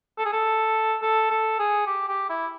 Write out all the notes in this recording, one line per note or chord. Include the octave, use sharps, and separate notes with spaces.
A4
G#4
A4
A4
A4
G#4
G4
G4
E4